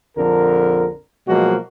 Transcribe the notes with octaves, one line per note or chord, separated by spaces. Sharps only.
A#1 F2 D3 A#4
B2 F3 F#3 G#3 A#3 F#4